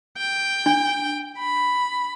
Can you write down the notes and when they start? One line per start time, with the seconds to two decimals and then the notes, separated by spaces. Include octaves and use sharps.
0.18 G5
0.66 D4
1.38 B5